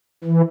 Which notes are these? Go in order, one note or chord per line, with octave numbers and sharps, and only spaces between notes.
E3